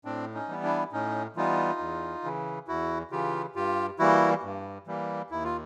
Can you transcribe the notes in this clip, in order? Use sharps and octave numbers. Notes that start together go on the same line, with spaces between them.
A2 C4 D4
C#4 D#4
E3 G3 B3
D4 E4
A2 C#4 D#4
E3 G3 B3 D#4 F4
E2
C#3 E3
E2 E4 F#4
C#3 E3 F4 G4
G2 F4 G4
E3 G3 A#3 E4 F#4
G2
E3 G3 A#3
D#2 E4
F4